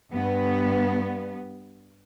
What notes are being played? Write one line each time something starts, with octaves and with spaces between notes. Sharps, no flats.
G2 B3